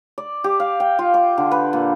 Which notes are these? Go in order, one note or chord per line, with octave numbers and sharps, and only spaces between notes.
D5
G4
F5
G5
F4
D6
D3
B4
A#2